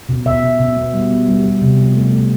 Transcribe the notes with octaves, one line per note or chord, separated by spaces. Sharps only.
B2
B2 E5
B2
B2
B3
G3
B3
G3
G3
C3
F3
A3
A3